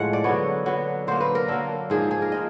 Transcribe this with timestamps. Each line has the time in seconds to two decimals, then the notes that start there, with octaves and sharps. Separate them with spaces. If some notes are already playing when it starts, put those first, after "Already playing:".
Already playing: A2 F3 G#3 F#5
0.13 D5
0.24 D3 F#3 B3 C#5
0.66 D3 F#3 B3
1.07 D3 F#3 A#3 C5
1.20 B4
1.35 A#4
1.48 D3 F#3 A#3 A4
1.90 G#2 F3 A#3 G#4
2.11 G#4
2.22 A#4
2.32 F3 D#5